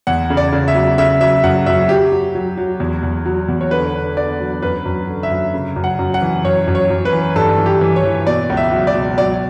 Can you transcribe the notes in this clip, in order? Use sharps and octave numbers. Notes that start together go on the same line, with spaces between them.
E2 F#5
C#3
D5
C#3
E5
F#3
C#3 E5
F#3 E5
F#2 F#5
F#2 E5
F#3 G4
F#3
F#3
F#3
E2
E2
F#3
E2
C#5
D3 B4
D3
D3 D5
F#3
F#2 B4
F#2
D3
E5
F#2
C#3
F#2
F#5
F#2
F#5
E3
F#2 C#5
F#2
C#5
F#2
B4
E3
G2 A4
E3
G4
E3
C#5
E3
B2 D5
C#2
E5
F#3
D5
B2
F#3 D5